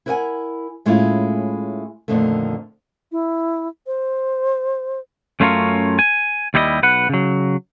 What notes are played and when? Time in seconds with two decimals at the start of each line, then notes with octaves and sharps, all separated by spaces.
0.06 E4 A#4 B4 D5 F#5 G#5
0.86 A2 G#3 A3 C#4 E4 F4
2.08 F2 A#2 D3 D#3 A3
3.12 E4
3.87 C5
5.40 F#2 A3 C#4 F4 A#4 C#5
5.99 G#5
6.54 D#2 G3 E4 G#4 D#5
6.83 B1 B4 F#5
7.09 C#3 F#3